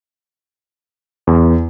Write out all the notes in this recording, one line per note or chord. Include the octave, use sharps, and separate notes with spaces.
E2